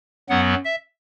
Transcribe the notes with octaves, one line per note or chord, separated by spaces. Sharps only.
F#2 F#3 B3 F#5
E5